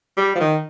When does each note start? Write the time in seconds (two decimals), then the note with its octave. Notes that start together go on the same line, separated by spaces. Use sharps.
0.18 G3
0.35 F3
0.40 D#3